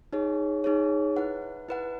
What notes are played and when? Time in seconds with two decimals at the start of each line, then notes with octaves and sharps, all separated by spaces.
0.13 D#4 G#4 C#5
0.64 D#4 G#4 C#5
1.16 E4 B4 F#5
1.69 E4 B4 F#5